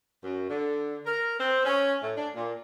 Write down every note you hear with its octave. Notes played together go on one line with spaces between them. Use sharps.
F#2
D3
A#4
C4
C#4
A2
D4
A#2